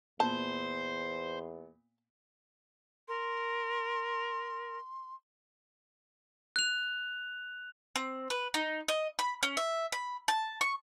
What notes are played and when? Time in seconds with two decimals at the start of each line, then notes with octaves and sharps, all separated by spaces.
0.20 E2 A#2 B3 C5 A5
3.08 A#4 C6
6.56 F#6 F7
7.96 C4
8.30 B4
8.54 D#4
8.88 D#5
9.19 B5
9.43 C#4
9.57 E5
9.92 B5
10.28 A5
10.61 C#6